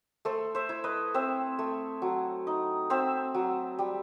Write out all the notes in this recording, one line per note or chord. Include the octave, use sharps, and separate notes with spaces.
A3 A4 C5
C5 E5
E4
B4 D#5
C4 C5 E5
A3
F#3
D#4
C4 C5 E5
F#3
G3